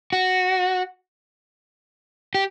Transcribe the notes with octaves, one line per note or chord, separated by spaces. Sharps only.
F#4
G4